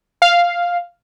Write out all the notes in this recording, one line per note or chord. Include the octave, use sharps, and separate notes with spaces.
F5